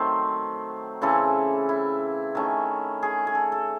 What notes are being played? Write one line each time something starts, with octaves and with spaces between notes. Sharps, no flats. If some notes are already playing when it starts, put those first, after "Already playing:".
Already playing: D#3 F#3 A3 C4 C5
C#3 E3 C4 A4
E4
D#3 A3 C#4
G#4
G#4
A4
A4